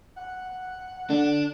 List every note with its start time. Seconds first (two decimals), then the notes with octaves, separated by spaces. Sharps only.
0.16 F#5
1.10 D3 D4